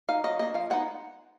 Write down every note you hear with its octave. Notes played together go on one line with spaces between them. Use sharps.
D#4 F5
F#3 D#5
A#3 D4 D#5
F3 F5
G#3 B3 D#4 F#5